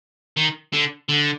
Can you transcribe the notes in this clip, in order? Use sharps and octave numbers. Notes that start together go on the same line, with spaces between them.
D#3
D3
D3